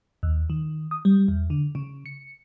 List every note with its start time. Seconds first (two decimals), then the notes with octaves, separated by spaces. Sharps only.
0.23 D#2
0.50 D#3
0.91 D#6
1.05 G3
1.28 E2
1.50 D3
1.75 C#3
2.06 C#7